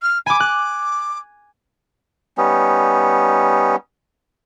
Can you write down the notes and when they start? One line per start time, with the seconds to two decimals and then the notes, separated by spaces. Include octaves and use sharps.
0.02 F6
0.26 G#5 B5 D6
0.40 D6 F#6
2.38 G3 B3 C#4 D#4